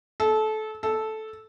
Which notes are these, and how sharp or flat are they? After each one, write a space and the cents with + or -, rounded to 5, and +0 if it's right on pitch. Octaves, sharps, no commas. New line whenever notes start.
A4 -25
A4 -10